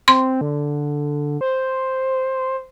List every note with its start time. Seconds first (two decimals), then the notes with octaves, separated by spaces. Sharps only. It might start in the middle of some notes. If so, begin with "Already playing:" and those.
0.08 C4 C6
0.41 D3
1.41 C5